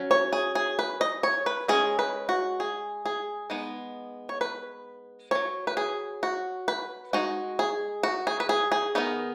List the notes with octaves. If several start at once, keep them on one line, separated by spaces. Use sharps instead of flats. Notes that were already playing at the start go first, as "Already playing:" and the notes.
Already playing: F#3 C#4
C#5
G#4
G#4
B4
D#5
C#5
B4
G#3 C#4 G#4
B4
F#4
G#4
G#4
G#3 B3 D#4
C#5
B4
F#3 C#4 C#5
B4
G#4
F#4
B4
G#3 D#4 F#4
G#4
F#4
G#4
B4
G#4
G#4
D#3 B3 D#4